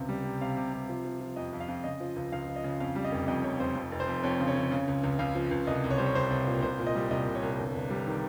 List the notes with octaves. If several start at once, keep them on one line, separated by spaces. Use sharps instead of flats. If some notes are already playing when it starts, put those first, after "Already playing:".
Already playing: C#2 C3
G3
C3
C3 F5
C3
C3
F3
F3
F3
F2 D#5
F2
F5
F2
C#3 D#5
F3
C#2
C#2 F5
F3
D#5
C#3
F2 F5
G3
D#5
F1
F2 D#5
F1 C#5
F1 C5
F2
F1
C5
F2
F2 C#5
C#3
C#5
C#3
C#3
C#2
C#2
C#2 F5
F3
C#2
C2 D#5
C2
C#5
G3 C5
C#5
C2 C5
C2
A#2
C2 C5
A#2
D#5
G3
C2 D#5
C2
C#5
C2
G1
G1
G3
D#3